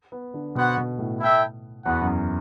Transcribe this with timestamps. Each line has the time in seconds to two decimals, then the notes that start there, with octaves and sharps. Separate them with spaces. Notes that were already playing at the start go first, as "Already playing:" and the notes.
0.12 B3
0.34 D3
0.55 B2 B3 F#4 C5 F#5
0.77 B2
0.99 A2
1.20 E4 A4 E5 G5
1.85 E2 B3 F#4 B4 F#5
2.01 F#2